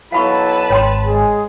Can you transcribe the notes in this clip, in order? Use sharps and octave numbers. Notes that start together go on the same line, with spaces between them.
B1 F#3 E4 B4 F5 A5 B5 C#6
G#1 C#5 G5 C6
G#3 G#4